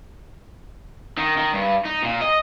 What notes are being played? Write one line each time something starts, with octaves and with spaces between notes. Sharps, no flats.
D#3
D#3
G2
D#4
A#2
D#5